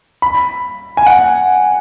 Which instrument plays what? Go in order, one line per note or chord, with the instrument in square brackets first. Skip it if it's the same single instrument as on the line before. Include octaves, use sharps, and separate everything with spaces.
[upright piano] B5
G#5
F#5